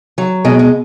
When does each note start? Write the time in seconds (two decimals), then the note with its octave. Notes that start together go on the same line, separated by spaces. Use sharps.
0.18 F#3
0.44 B2 G#3
0.59 G#3